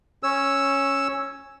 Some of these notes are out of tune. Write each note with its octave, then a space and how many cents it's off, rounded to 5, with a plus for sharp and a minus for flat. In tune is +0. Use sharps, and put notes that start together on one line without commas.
C#4 -10 C#5 +0 E6 +0